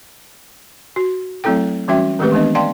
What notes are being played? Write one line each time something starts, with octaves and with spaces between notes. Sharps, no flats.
F#4
F#3 A3 C4 E4 A4 G5
E3 G3 C#4 F#4 E5 G5
D#3 G#3 A3 C4 G4 B4
E3 G#3 B3 D4 D#5
D5 F5 G5 A5 C6